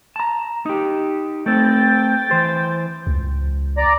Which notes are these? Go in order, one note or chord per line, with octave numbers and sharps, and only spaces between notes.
A5 A#5
D#4 G4
A3 C4 G5 A6
E3 C5
C#2
D5 A#5